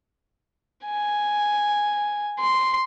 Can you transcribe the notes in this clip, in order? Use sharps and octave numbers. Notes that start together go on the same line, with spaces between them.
G#5
C6